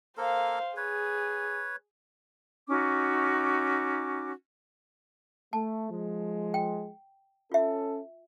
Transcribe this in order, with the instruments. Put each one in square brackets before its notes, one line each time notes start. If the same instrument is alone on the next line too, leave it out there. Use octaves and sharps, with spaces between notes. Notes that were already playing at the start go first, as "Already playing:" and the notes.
[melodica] A#3 A4 A#4 [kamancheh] C5 F5
[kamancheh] G#4 [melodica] B4 C#5
[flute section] C#4 D#4 F#4 D6
[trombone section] A3 [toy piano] A5
[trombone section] F3 G#3
[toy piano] G5
[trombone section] C#4 A4 [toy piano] F4 E5